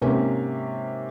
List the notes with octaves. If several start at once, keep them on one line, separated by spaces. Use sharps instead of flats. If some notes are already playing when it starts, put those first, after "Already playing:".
G#2 C3 A#3 C#4